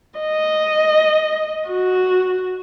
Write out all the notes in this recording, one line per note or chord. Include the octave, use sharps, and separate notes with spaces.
D#5
F#4